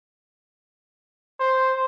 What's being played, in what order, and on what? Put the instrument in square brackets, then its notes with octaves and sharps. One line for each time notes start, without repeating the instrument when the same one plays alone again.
[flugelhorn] C5